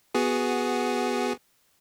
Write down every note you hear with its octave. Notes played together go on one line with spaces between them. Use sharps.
B3 F#4 G#4